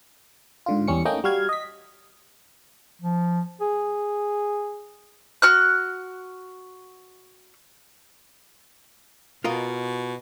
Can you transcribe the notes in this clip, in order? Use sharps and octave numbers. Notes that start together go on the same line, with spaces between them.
G#2 D3 F4
E2 G3 C#4 C#7
A3 A#3 C#4 D#4 D#5 G5
G3 F#4 F5 G#6
D#5 B6
F3
G#4
F#4 F6 F#6
B2 F4 A#4 D#5